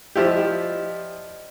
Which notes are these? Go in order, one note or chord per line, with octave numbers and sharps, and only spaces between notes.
F3 E4 G4 D5 D#5